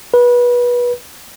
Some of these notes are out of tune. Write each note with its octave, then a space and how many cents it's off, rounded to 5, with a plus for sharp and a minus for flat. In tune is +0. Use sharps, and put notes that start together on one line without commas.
B4 -25